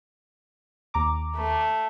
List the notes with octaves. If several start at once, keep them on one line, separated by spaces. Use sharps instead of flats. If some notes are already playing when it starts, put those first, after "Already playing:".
D#2 A#5 D6
A3